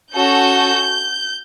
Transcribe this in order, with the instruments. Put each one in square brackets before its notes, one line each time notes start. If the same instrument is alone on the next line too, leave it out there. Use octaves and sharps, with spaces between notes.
[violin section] C#4 F#4 A4 G6